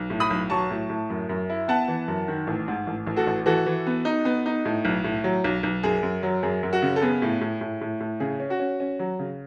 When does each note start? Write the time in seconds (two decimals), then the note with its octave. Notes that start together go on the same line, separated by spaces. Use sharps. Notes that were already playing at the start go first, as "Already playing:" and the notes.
Already playing: B1
0.10 A2
0.20 B5 D#6
0.30 B1
0.50 F#3 A5 C#6
0.70 A2
0.89 A2
1.10 F#2
1.29 F#2
1.49 E4
1.68 B3 F#5 A5
1.88 E3
2.08 F#2
2.28 D#3
2.47 A1
2.68 G#2
2.87 A1
3.07 A1
3.17 F#4 A4
3.27 A1
3.46 E3 F#4 A4
3.66 E3
3.86 B3
4.05 D#4
4.25 B3
4.46 D#4
4.65 A2
4.85 B1
5.04 A2
5.24 F#3
5.44 B1
5.63 B1
5.83 F#2 G#4
6.03 F#2
6.23 F#3
6.43 F#2 G#4
6.63 F#2
6.73 F#4
6.82 C#3
6.96 A4
7.02 B3 G#4
7.22 A2
7.41 A2
7.61 A2
7.81 A2
8.00 A2
8.20 C#3 G#4
8.40 C#4
8.50 F#4
8.60 C#4
8.80 C#4
8.99 F#3
9.19 C#3